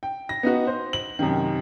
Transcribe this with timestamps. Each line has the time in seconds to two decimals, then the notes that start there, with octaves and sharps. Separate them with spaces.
0.03 G5
0.29 A#6
0.43 B3 D#4 F#4
0.67 C5
0.93 F#7
1.19 F#2 C3 D#3